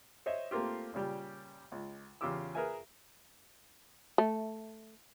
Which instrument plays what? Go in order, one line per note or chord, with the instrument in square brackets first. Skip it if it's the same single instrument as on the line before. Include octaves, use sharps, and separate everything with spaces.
[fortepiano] C5 C#5 D#5 E5
A3 A#3 C4 F4 G4
A#2 C#3 G3 G4
C#2
E2 C#3 F4 G4 D6 E6
G#4 A#4 B4 E5 G#5
[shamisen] A3